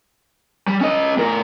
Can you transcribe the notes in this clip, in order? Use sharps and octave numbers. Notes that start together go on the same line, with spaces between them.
G3
C#4 D#5
A2 A#4